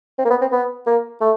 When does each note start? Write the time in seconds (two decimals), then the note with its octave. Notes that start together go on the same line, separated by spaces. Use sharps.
0.19 C4
0.25 A#3
0.31 B3
0.41 C4
0.52 B3
0.87 A#3
1.21 A3